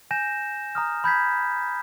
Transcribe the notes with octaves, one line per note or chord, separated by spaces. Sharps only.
G#5 G6 A#6 E7
A#5 D#6 F6
B5 G6 G#6 B6